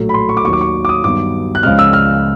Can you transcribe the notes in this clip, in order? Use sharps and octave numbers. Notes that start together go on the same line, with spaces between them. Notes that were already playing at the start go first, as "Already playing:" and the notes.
Already playing: A#1 A2 F#3 A3
B5
C6
C#6
D6
D#2 D#3 F#3 C#6
D6
C#6
D6
D#6
G2 D#3 F#3 B3 D6
F#6
C#2 C#3 F3 G#3 F6
E6
F6